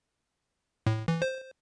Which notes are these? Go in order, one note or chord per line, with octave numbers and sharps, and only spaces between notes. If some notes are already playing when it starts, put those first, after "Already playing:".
A2
E3
C5